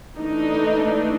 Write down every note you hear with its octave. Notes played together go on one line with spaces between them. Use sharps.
E3 A3 D4 D#4